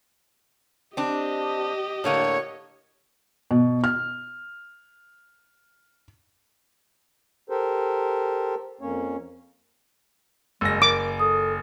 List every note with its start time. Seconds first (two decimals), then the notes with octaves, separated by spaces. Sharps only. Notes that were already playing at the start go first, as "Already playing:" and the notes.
0.97 C4 D4 G4 D#5
2.04 A2 D3 A#3 C#5
3.51 B2
3.84 F6
7.50 G4 A4 A#4 C5
8.81 F2 A#3 C#4 C#5
10.61 F#1 G#3 E6 A#6
10.82 A#4 D6
11.19 A4 D#6